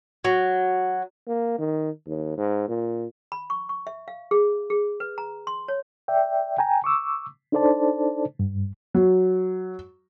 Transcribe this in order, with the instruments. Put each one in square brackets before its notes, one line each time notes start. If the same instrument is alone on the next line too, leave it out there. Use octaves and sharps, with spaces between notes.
[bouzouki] F#3
[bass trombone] A#3
D#3
D#2
G#2
A#2
[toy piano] B5
C#6
C#6
E5
F5
G#4
G#4
B4
A#5
C6
C#5
[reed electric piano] D5 E5 G5
G5 G#5 A#5
C#6 D6 E6
D4 D#4 A4 C5 D5 A5
G2
[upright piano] F#3